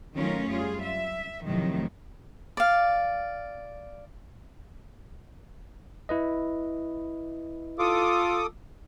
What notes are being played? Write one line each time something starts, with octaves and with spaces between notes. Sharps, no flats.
D#3 F#3 A3 C#4 F4 A#4
F#2 G3 F4 G#4
E5
F2 A2 C3 D#3 F3 F#3
D5 F5
E4 B4 D#5
F4 A4 D6 D#6